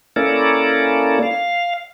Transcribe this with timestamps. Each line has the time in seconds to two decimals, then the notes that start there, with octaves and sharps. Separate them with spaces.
0.16 A#3 C#4 E4 A4 A#4 D5
1.23 F5